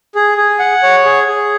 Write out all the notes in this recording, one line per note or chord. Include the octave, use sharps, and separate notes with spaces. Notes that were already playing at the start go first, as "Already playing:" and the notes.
G#4
G#4
F#5
C#5
G#4
G#4